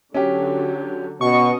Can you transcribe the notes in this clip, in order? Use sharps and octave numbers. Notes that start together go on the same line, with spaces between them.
D3 F#3 C#4 G4
B2 C#4 D#5 C#6